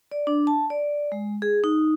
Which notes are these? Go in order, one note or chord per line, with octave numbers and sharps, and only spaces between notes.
D5
D4
A5
D5
G#3
G#4
D#4